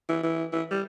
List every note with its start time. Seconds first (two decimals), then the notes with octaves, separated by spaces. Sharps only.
0.09 E3
0.23 E3
0.52 E3
0.71 G3